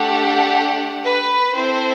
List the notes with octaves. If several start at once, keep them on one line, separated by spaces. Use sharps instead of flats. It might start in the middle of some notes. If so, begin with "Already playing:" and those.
Already playing: A3 D4 G4 F#5
B4
C4 E4 A4 C5